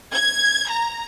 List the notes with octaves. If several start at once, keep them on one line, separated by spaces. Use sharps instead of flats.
G#6
A#5